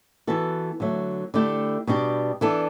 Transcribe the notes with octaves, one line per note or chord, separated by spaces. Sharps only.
E3 B3 F#4 A4
D3 F#3 A3
D3 A3 E4 G4
B2 G3 D4 G4
E3 B3 D4 A4